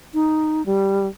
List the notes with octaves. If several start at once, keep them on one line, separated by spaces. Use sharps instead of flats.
D#4
G3